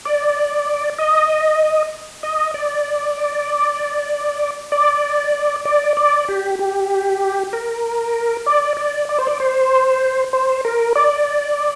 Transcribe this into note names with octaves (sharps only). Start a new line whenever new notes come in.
D5
D#5
D#5
D5
D5
D5
D5
G4
G4
A#4
D5
D5
D5
C5
D5
C5
C5
A#4
D5